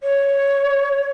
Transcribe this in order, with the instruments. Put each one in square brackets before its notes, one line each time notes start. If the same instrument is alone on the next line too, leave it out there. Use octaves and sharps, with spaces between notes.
[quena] C#5